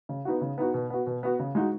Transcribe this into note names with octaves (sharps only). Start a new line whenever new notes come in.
C#3
B3 D#4 F#4
C#3
B3 D#4 F#4
B2
B3 F#4
B2
B3 F#4
C#3
G#3 D#4 F#4